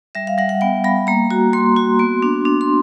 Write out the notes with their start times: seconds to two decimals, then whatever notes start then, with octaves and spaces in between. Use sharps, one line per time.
0.15 G3 E5
0.27 F5
0.38 G3 F#5
0.49 F#5
0.61 B3 G5
0.84 G3 B5
1.07 A#3 A#5
1.30 F#4 A#5
1.53 A#3 C6
1.76 F#4
1.99 B3
2.22 D4
2.45 D4
2.61 C6